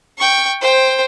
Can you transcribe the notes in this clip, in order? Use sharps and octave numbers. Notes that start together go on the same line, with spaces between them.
G5 C#6
C5 G5